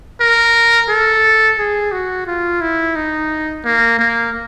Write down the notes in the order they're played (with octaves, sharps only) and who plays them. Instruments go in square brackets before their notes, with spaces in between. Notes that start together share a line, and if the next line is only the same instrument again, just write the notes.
[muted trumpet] A#4
A4
G#4
F#4
F4
E4
D#4
A#3
A#3